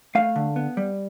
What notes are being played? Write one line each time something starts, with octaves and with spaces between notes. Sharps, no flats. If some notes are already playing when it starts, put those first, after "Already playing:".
A3 F5
D3
B3
G3